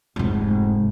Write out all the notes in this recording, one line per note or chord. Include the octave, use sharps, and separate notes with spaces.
F1 G#2